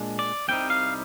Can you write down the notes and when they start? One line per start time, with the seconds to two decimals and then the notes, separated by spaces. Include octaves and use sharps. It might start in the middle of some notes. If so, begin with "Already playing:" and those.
Already playing: A#2 G#3 D4
0.19 D5
0.48 C2 C3 G3 C4 D#4 G5
0.70 F5